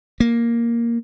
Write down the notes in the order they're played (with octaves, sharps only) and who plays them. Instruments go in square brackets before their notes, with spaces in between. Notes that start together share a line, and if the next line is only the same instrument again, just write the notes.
[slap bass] A#3